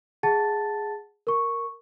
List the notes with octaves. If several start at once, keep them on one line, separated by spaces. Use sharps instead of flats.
G#4 F#5 A5 A6
A#4 C#6